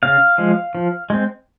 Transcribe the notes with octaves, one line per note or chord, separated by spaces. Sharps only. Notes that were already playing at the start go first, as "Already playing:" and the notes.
C#3 F5
F3 G#3
F3
G#3 C4